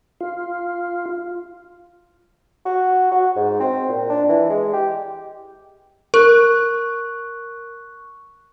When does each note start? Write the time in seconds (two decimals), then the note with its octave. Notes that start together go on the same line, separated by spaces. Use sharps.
0.21 F4
2.66 F#4
3.12 F#4
3.36 G#2
3.60 C4
3.89 A#2
4.10 D4
4.29 E3
4.49 G#3
4.73 G4
6.14 A#4 C#6 F#6